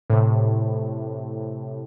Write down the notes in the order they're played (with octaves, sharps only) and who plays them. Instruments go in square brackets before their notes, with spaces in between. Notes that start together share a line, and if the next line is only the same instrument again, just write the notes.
[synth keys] A2 C3